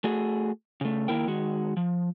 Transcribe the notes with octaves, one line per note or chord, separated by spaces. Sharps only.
A3 F#4 G#4
C#3 A3
D#3 A#3 E4 A#4 G5
D#3 G#3 F#4
F3